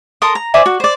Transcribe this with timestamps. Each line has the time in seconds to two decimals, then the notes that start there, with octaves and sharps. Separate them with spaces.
0.22 A4 A#4 C6 D#6
0.35 A#5
0.54 C5 D5 E5 G#5
0.66 F#4
0.80 C5 D5